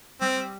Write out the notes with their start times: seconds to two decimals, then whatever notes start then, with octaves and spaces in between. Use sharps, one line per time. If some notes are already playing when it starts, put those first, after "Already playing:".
0.21 G3 C4
0.37 G3